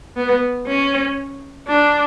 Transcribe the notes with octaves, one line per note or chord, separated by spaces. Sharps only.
B3
C#4
D4